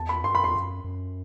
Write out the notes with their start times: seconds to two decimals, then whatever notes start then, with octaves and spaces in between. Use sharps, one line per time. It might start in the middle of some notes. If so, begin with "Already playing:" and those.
Already playing: E2 A5
0.09 B5
0.24 G2 C6
0.35 F#2 B5
0.44 E2 C6
0.55 F#2
0.84 F#2